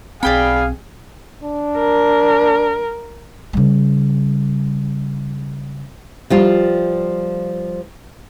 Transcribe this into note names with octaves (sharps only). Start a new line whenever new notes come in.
B1 C4 G#4 D5 F5 G5 B5
D4
A#4
C#3 G3
F3 G3 F4